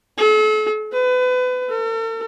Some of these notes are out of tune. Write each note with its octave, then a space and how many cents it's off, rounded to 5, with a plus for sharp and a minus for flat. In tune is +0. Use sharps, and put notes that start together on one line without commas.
A4 -40
B4 +30
A4 +45